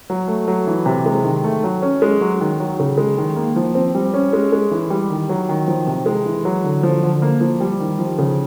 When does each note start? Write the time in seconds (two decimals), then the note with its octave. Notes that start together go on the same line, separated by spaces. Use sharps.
0.10 F#3
0.28 A3
0.48 F#3
0.67 E3
0.86 C3
1.06 G#3
1.24 D#3
1.44 A3
1.64 F#3
1.82 C#4
2.02 G#3
2.21 F#3
2.41 D#3
2.60 F#3
2.79 C#3
2.98 G#3
3.18 D#3
3.36 A#3
3.56 F3
3.75 C4
3.95 G3
4.14 C#4
4.33 G#3
4.52 G#3
4.71 E3
4.90 G3
5.10 D#3
5.29 F#3
5.49 D#3
5.68 F3
5.87 C3
6.06 G#3
6.25 E3
6.45 F#3
6.64 D3
6.83 F3
7.03 D3
7.22 A#3
7.41 F3
7.60 G3
7.80 D#3
7.99 F3
8.18 C#3